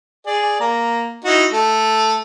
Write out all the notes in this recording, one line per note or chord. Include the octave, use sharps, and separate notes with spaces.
G#4 D5
A#3 A#5
D#4 E4 F#4
A3